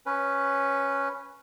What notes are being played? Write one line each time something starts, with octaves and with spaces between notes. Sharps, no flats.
C#4 B4